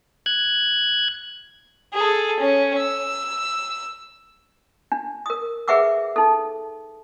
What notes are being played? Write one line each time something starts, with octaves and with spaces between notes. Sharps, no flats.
F#6 G#6
G#4 A4
C#4
E6
D4
A#4 D#6
G#4 B4 E5 F#5 D6 E6
D#4 A4